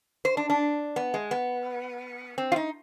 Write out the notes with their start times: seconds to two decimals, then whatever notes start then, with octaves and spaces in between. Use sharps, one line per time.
0.25 C5
0.37 D4
0.50 D4
0.96 B3
1.14 G#3
1.31 B3
2.38 C4
2.52 F4
2.56 D#4